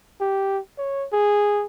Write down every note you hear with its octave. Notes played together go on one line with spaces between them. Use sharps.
G4
C#5
G#4